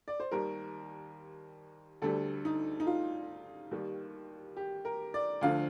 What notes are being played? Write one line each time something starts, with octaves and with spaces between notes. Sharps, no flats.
D5
C5
D#2 D#3 G3 A#4
D2 D3 G3 A4
D#4
D#4
F4
D#2 D#3 G3
G4
A#4
D5
D2 D3 F3 F5